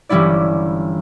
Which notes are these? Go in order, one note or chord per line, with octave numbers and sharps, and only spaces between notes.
G1 E3 G3 C#4 E4 D5